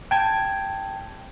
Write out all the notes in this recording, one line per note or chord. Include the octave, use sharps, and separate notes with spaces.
G5 A5 G#6